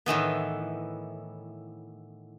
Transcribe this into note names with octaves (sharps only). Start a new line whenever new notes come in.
A2 D#3 E3 B3